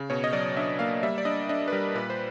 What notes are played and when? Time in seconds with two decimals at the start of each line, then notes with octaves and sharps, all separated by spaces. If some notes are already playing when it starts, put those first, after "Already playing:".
Already playing: C#3
0.10 B2 C#5
0.24 D#5
0.33 F#3 D5
0.57 D4 E5
0.79 A#3 F5
1.03 G3 E5
1.18 D5
1.25 D4 D#5
1.49 D4 D#5
1.68 B4
1.73 G3 A#4
1.95 A#2 B4
2.10 C5